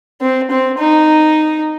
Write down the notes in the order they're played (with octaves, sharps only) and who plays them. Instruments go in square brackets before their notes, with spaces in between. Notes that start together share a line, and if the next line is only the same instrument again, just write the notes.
[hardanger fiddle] C4
C4
D#4